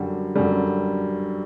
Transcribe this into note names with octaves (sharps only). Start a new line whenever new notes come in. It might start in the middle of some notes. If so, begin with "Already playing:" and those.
Already playing: F#2 D3 G3
F#2 D3 G3